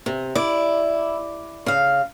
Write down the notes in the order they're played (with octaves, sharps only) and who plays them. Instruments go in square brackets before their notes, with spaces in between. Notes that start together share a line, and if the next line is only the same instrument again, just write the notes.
[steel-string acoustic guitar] C3
[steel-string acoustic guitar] E4 [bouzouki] D5
[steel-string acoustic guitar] C#3 F5